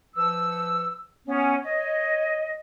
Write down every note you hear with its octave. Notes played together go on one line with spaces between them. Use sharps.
F3 B4 E6
B3 C#4
C#5 D#5